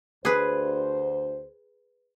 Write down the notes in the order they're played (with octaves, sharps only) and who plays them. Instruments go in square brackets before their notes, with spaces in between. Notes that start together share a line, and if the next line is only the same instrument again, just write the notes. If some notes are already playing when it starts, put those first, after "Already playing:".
[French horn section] D2 C5 [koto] G#4 B4